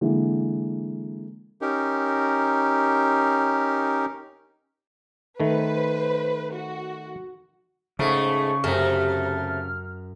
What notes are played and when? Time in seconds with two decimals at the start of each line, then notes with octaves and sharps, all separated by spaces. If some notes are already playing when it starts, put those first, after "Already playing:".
0.01 D3 E3 G#3 A#3
1.61 C#4 D#4 G4 A#4
5.40 D#3 A3 B4 C5
6.53 F#4
7.99 G#2 C#3 A3 C#6
8.64 F#2 C3 A3 F6